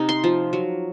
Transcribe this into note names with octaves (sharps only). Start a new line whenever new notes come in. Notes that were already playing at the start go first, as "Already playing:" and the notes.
Already playing: C3 D#4
C6
F3
F#3